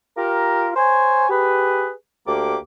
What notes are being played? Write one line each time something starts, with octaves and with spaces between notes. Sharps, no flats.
F4 G4 A#4
C5 C#5 G#5
G4 G#4 B4
D2 A#3 G4 D6